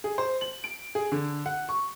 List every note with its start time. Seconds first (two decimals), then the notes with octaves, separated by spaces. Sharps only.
0.04 G#4
0.18 C5
0.41 F#7
0.64 D7
0.95 G#4
1.12 D3
1.46 F#5
1.69 C#6